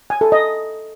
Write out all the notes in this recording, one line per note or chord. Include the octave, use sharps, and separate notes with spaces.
G#5
A4
D#5